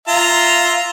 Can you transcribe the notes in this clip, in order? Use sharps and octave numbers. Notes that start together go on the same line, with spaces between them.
F4 E5 A#5